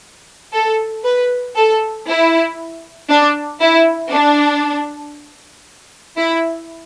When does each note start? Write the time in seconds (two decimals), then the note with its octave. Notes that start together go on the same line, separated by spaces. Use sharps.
0.53 A4
1.04 B4
1.56 A4
2.07 E4
3.09 D4
3.60 E4
4.11 D4
6.17 E4